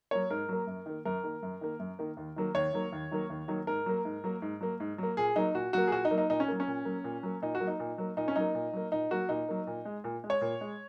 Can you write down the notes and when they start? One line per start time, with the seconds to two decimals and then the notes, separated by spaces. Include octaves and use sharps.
0.11 F#3 A#3 C#5
0.30 G#2 A#4
0.49 F#3 A#3
0.67 F#2
0.86 D#3 A#3
1.05 F#2 A#4
1.24 D#3 A#3
1.43 F#2
1.61 D#3 A#3
1.79 F#2
1.99 D#3 A#3
2.17 D#2
2.36 D#3 F#3 A#3
2.55 D#2 C#5
2.73 D#3 F#3 A#3
2.92 D#2
3.11 D#3 F#3 A#3
3.30 D#2
3.48 D#3 F#3 A#3
3.67 G#2 A#4
3.86 F#3 A#3
4.05 G#2
4.24 F#3 A#3
4.42 G#2
4.61 F#3 A#3
4.80 G#2
4.98 F#3 A#3
5.17 A#2 G#4
5.36 F#3 A#3 D#4
5.55 A#2 F#4
5.73 F#3 A#3 F#4
5.87 G#4
5.92 A#2 F#4
6.05 D#4
6.11 F#3 A#3
6.18 D#4
6.30 A#2 D#4
6.40 C#4
6.48 F#3 A#3
6.60 C#4
6.68 A#2
6.85 F#3 A#3
7.04 A#2
7.23 F#3 A#3
7.42 A#2 D#4
7.55 F#4
7.60 F#3 A#3
7.67 D#4
7.80 A#2
7.98 F#3 A#3
8.17 A#2 D#4
8.28 C#4
8.36 F#3 A#3 D#4
8.55 A#2
8.73 F#3 A#3
8.92 A#2 D#4
9.11 F#3 A#3 F#4
9.29 A#2 D#4
9.48 F#3 A#3
9.67 A#2
9.85 G#3
10.04 A#2
10.24 G#3
10.30 C#5
10.41 A#2
10.61 G#3